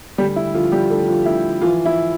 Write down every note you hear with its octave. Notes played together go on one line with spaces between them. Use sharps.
D2 G3 G4
E4
D3 F3 F4
G3 G4
D3 A3 A4
F3 F4
D2 E4
E3 F3 F4
E4